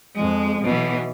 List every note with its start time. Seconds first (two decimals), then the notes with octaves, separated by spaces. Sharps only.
0.15 F2 G#3
0.64 B1 B2 E3